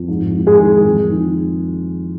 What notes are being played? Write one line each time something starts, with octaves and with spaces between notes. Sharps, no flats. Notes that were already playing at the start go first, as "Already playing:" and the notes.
Already playing: F2
G#2
G#2
G#3 G#4
D#3
F2
D#3